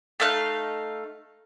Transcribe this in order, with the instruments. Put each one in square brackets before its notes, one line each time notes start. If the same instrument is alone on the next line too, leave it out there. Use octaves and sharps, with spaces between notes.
[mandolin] A3 D#4 F5 F#6